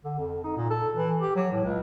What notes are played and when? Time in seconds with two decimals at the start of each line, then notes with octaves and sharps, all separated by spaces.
0.04 D3
0.18 F2
0.44 D#4
0.57 A#2
0.70 A4
0.96 E3
1.20 G4
1.36 F#3
1.52 A2
1.64 C#2